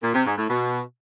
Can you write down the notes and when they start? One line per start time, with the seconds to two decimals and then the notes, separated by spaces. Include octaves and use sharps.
0.02 A#2
0.14 C3
0.26 G#2
0.37 A2
0.49 B2